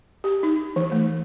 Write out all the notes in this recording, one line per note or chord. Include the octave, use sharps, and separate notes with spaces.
G4
D#4
E3
A3